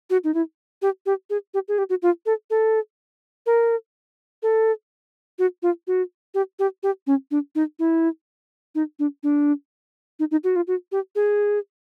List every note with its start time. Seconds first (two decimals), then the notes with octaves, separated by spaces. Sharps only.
0.10 F#4
0.24 D#4
0.34 E4
0.82 G4
1.06 G4
1.30 G#4
1.54 G4
1.68 G#4
1.78 G4
1.89 F#4
2.02 F4
2.26 A4
2.50 A4
3.46 A#4
4.43 A4
5.39 F#4
5.62 F4
5.87 F#4
6.34 G4
6.59 G4
6.83 G4
7.07 C#4
7.31 D4
7.55 D#4
7.79 E4
8.75 D#4
8.99 D4
9.23 D4
10.19 D#4
10.31 D#4
10.44 F#4
10.56 F4
10.67 F#4
10.92 G4
11.15 G#4